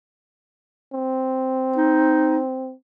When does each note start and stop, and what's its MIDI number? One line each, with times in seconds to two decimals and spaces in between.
0.93 2.73 60
1.76 2.39 63